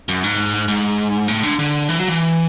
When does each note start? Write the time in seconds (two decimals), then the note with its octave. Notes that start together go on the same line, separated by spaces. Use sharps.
0.09 F#2
0.24 G#2
0.68 G#2
1.28 A2
1.43 D3
1.59 D3
1.89 E3
1.99 F#3
2.08 E3